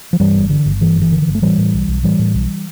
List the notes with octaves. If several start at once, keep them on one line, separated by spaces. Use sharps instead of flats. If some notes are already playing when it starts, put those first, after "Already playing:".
F3
G2 E3 G3
G1
D3
G1
G2 E3
G1
E3
D3
E3
G1
A3
A2 E3 G3
A2
B1
B1
A2 E3 G3
A2
B1